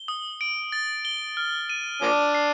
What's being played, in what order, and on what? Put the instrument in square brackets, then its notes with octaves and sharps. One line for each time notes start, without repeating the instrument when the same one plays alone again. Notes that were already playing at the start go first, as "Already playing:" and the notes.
Already playing: [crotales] G7
D#6
D7
A6
G7
F6
D#7
[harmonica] F3 A#3 D4 [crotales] D6
[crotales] C7